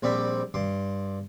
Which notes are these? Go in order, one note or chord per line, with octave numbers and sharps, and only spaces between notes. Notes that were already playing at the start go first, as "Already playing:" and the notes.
A#1 G3 C4 D5 B5
G2 C6 D6